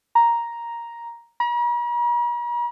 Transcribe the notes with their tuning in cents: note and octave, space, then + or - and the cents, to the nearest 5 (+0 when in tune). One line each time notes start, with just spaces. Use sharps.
A#5 +5
A#5 +45